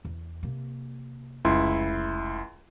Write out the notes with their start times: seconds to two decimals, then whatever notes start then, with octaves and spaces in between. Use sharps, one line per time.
0.05 E2
0.43 C3 A#3
1.45 F1 C#2 E4 C6